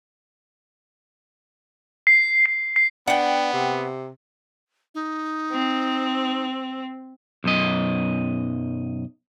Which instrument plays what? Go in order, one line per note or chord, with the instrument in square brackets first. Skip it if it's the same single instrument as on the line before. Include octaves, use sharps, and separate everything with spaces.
[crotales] C7
C7
C7
[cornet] B3 [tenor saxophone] D4 [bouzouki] F#5 G5
[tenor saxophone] C3
[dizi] D#4
[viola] C4
[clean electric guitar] B1 F#2 D#5